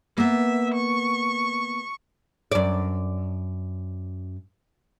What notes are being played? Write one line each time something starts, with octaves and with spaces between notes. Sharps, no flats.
A#3 B3 E5
C#6
F#2 D5